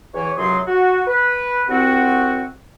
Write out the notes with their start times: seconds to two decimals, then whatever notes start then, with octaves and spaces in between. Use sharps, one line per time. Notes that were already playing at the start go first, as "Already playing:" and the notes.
0.14 E2 E3 C#5
0.37 C#2 F#2 C3 F#3 G#4 C6
0.68 F#4
1.07 B4
1.68 C2 C4 F#4